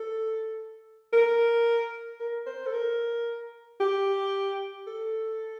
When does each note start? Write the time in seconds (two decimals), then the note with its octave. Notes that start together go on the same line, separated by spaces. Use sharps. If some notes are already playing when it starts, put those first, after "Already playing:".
Already playing: A4
1.13 A#4
2.20 A#4
2.47 C5
2.66 A4
2.73 A#4
3.80 G4
4.87 A4